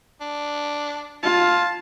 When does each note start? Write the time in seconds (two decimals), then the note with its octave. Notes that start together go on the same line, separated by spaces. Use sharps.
0.21 D4
1.23 F4 A5